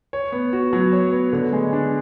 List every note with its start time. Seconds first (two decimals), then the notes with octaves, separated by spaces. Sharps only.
0.13 C#5
0.32 B3
0.53 F#4
0.73 F#3
0.92 C#5
1.12 B3
1.33 D3
1.53 G#3
1.73 D4